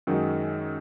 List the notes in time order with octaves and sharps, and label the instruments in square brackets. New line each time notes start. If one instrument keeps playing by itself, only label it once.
[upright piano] F#2 D#3 G#3 D#4 F#4